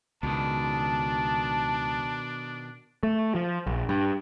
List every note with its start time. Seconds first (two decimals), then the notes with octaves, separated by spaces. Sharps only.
0.23 C#2 B2 D#3 D4 A5
3.03 A3
3.35 F3
3.67 A#1
3.89 G2